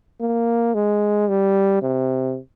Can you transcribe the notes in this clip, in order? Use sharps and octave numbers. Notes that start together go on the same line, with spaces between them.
A#3
G#3
G3
C3